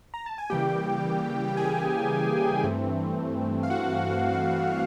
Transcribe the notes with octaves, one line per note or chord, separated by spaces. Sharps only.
A#5
A5
G#5
C#3 E3 G3 A#3 G4 G5
G5
G#4 G#5
G2 E3 A3 C4
F5
F#4 F#5